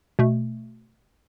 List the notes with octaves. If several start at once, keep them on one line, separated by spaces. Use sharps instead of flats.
B2 A3